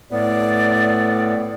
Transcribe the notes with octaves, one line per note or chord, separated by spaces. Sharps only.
A2 B3 D5